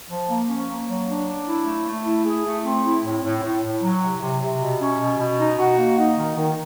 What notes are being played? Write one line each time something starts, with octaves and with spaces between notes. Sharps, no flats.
F3
A#3
C#4
A#3
F#3
D4
D4
E4
A3
A3
E4
G#4
A3
C4
E4
A2
A2
A2
A2
F#3
C3
C3
C3
B2
C#4
B2
B2
D#4
F#4
A#3
D#4
D#3
D#3